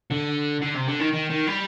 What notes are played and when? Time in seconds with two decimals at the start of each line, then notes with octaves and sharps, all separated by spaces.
0.11 D3
0.62 D3
0.74 C3
0.87 D3
0.99 D#3
1.12 D#3
1.30 D#3
1.47 G3